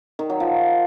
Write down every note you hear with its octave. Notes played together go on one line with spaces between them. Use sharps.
D#3
F#3
F3